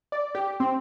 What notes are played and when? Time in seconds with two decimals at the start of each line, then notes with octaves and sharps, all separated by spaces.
0.12 D5
0.35 G4
0.60 C4